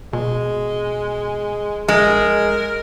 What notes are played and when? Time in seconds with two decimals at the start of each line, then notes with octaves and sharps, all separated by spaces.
0.13 B2 G#3
1.88 A#1 G#3 A#4